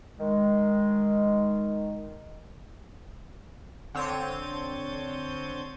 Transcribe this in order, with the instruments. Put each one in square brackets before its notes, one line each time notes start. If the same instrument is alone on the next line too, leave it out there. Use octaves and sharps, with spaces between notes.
[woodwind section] D#3 G#3
[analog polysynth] D3 C4 C#5 G6 A6 D#7